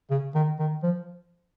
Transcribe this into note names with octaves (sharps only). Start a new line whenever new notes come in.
C#3
D#3
D#3
F3